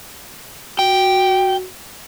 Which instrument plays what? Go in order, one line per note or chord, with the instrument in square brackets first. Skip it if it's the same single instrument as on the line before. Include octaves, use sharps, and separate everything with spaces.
[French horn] F#4 [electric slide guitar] G5